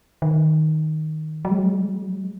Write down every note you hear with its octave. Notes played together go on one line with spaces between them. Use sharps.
D#3
F#3
G#3
F#3
G#3
F#3
G#3
F#3
G#3
F#3
G#3
F#3
G#3